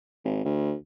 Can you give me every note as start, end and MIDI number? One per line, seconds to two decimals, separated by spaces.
0.25 0.40 32
0.45 0.74 38